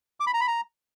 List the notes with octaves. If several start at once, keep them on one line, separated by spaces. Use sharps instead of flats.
D6
B5
A#5
B5
A#5